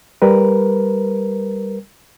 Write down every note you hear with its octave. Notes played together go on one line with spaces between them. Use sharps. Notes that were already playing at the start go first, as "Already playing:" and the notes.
G3 A#4 B4